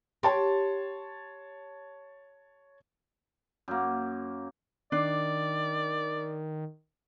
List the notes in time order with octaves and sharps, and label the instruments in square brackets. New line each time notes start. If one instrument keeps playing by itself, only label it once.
[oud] G4 [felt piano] C#5 A5 C6
[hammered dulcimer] F#2 A#3
[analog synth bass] D#3 [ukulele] D4 [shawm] D5